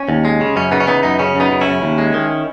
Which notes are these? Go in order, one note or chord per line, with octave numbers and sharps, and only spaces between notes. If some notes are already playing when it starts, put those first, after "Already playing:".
Already playing: C#4
D#2
G#3
C#3
F#2 C#4
C#3 B3 D#4
C#4
E3 B3 D#4
F#2 B3 D#4
C#3 C#4
F#2 B3 D#4
C#3
C#4 E4
F#2
D#2
G#3
D#3